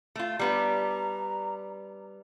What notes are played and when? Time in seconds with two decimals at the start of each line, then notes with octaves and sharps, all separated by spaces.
0.15 A3 F4
0.39 G3 B3 D4 A#5